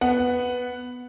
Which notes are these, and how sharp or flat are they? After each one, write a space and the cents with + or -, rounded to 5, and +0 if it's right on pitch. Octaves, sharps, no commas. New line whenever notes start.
B3 +0 F#5 +0